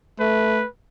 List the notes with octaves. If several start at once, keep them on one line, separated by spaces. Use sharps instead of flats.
A3 B4